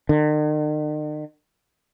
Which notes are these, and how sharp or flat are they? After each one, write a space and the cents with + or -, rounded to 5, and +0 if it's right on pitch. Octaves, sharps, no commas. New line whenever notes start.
D#3 -45